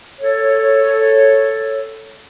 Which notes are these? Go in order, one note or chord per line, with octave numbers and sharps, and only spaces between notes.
A4 C#5